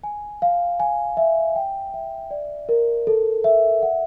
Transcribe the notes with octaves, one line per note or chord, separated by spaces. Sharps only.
G#5
F5
G#5
E5
G5
E5
D5
A#4
A4
E5
F#5